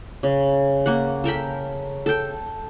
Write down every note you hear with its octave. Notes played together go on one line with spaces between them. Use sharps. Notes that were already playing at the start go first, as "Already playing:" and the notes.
C#3
A#3 F#5
A4 A#4 G5 B5
A4 G5